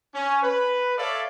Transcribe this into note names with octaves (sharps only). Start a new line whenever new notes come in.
C#4
B4
A4 C#5 D5 E5 F5